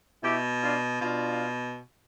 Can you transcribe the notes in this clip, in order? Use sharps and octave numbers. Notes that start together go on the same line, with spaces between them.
B2 E4 G4
D4 F4
B2 D4 F4